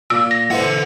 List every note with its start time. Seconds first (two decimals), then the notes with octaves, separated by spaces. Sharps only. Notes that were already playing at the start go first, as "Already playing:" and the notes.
0.10 A#2 E6
0.31 A#6
0.51 E4 A4 B4 C5 F#5